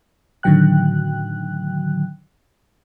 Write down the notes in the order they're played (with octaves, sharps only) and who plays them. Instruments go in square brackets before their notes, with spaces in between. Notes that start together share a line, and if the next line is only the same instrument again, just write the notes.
[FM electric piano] A2 D3 D#3 F#3 G5 F#6